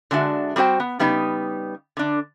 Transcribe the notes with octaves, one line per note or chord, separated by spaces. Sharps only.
D3 G#3 D4 F4 F#4 E5
G3 C4 F#4 C5 G5
B3
C#3 G3 B3 D#4
D3 D4